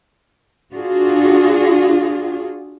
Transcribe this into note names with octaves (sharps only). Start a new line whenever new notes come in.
D4 F4 F#4 G#4